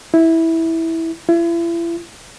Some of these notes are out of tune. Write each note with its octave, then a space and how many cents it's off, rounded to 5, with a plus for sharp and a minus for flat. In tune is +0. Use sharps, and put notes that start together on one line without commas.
E4 -10
E4 +40